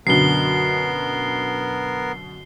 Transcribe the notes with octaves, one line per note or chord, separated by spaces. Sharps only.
F#2 B2 D3 B3 A#4 C7 G7